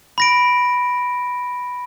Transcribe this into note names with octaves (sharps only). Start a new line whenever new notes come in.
B5 A#6 D7